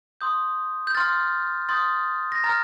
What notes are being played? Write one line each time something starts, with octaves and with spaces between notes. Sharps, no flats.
C6 D#6 G6
G6
C6 F6 A6
C6 D#6 G6 A6
A#6
A#5 F6 A6